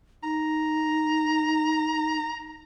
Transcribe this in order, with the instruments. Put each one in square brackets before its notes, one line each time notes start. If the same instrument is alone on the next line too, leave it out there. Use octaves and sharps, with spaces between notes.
[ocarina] D#4 [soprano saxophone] A#5